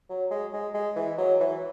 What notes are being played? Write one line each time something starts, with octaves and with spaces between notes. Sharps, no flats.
F#3
G#3
G#3
G#3
E3
F#3
E3